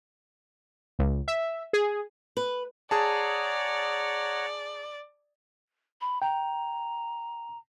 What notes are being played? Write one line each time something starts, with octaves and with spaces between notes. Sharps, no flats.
C#2
E5
G#4
B4
G#4 C#5 D5 F#5 A5 A#5
B5
G5 A#5